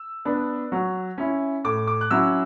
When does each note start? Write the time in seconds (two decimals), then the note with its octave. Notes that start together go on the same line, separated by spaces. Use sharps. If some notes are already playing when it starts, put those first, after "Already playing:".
Already playing: E6
0.25 B3 D4
0.72 F#3
1.18 C#4 E4
1.64 A2 D6
1.87 D6
2.01 F#6
2.11 F#3 C#4 E4 E6